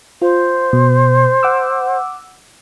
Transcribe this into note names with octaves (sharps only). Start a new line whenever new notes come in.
F4 C5
B2
F#5 D6 E6